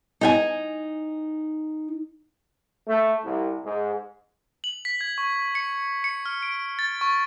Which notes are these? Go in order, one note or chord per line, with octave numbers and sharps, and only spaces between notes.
D#4 G5 G#5
A3
C2
G#2
F#7
B6
G#6
C#6
C#7
C#7
F6
D7
A6
C#6